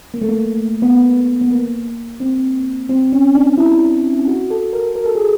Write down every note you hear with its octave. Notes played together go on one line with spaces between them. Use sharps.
A#3
A3
A#3
B3
B3
A#3
C4
C4
C#4
D4
E4
F#4
A4
A#4
A#4
A4
G#4